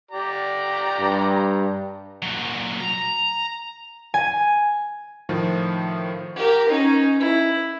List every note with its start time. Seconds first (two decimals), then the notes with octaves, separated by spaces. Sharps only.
0.11 G4 D5 A#5
1.00 G2
2.22 A#2 F#3
2.81 A#5
4.14 G#5
5.29 A2 D#3 F3
6.36 G4 A#4
6.68 C#4 D#4
7.19 E4